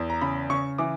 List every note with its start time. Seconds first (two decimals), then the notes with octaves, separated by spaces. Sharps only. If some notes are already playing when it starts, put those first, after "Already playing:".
Already playing: E2
0.10 A#5
0.21 C#3 B5
0.50 C#3 C#6
0.78 E3 D6